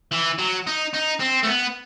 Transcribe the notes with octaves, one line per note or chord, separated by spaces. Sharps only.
E3
F#3
D#4
D#4
C4
A3
B3